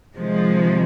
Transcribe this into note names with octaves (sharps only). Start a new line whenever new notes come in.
C3 D#3 F3 G#3